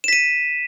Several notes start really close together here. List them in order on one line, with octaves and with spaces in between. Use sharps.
E7 B6 D#7